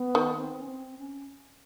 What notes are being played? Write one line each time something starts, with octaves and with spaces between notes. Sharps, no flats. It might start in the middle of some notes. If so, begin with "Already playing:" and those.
Already playing: B3
D#3
C4
C#4
C4
C#4